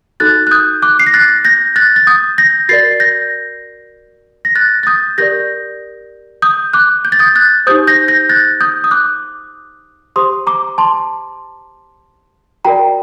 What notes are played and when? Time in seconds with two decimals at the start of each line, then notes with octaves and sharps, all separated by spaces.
0.20 D#4 F#4 A4 F#6 A6
0.47 F#6
0.51 D#6 G6
0.82 D6 F#6
0.99 C7
1.07 A#6
1.14 F#6 A6
1.45 G6 A#6
1.76 F#6 A6
1.96 A6
2.07 D#6 G6
2.38 G6 A#6
2.69 F#4 A#4 D5 A6 C7
3.00 G6 A#6
4.45 A#6
4.55 F#6 A6
4.83 A6
4.87 D#6 G6
5.18 G4 A#4 D5 G6 A#6
6.42 D#6 G6
6.73 D6 F#6
7.05 G6
7.12 A6
7.19 D#6 G6
7.36 F#6 A6
7.67 D#4 G4 C5 D#6 G6
7.87 G6 A#6
8.08 G6 A#6
8.29 F#6 A6
8.61 D#6 G6
8.84 D#6
8.91 D6 F#6
10.16 G4 C5 C6 D#6
10.47 A#5 D6
10.78 A5 C6
12.65 F#4 A#4 D5 G5 A#5